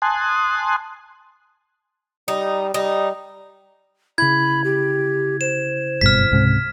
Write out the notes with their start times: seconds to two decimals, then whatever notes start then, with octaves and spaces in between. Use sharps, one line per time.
0.02 G#5 A5 C6 D#6 F#6
2.28 G3 D#4
2.74 G3 D#4
4.18 C#3 E4 B5 G#6
4.64 G4
5.41 C5 E7
6.01 F#1 G2 B2 F6 B6
6.31 C#2 G#2 C3